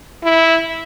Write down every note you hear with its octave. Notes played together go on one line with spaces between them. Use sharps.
E4